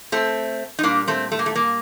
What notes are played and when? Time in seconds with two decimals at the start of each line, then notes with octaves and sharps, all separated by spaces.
0.12 A3 C4
0.79 D#4
0.83 A#2 G3 A#3 D4
1.08 A3 C4
1.32 A3
1.39 A#3
1.46 A3
1.55 A#3